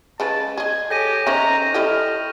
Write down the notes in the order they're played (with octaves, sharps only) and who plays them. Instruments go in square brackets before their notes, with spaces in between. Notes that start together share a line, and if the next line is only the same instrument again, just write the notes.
[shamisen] C#3 G#3 B4 [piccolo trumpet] A5
[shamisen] G#4 D#5 [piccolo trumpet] G#6
[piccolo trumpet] G4 [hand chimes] A4 C#5 G#5 [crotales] G6 A#6 D#7
[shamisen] D#3 C#4 D#5 [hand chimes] C5 E5 [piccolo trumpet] A#5 [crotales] C#6
[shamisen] E4 G4 D#5 [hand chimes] A4 [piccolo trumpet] F6